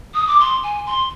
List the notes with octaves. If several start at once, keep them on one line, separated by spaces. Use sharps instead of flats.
D#6
D6
C6
G#5
C6